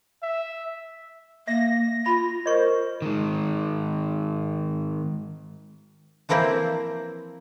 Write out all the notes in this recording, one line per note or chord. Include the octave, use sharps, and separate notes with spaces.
E5
A#3 E5 A#6
F4 B5
A#4 C5 D#5 C#6
D#3 G#3
E3 F3 A#3 C4 E4